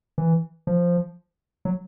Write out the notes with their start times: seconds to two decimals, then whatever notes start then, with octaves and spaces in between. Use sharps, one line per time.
0.18 E3
0.67 F3
1.65 F#3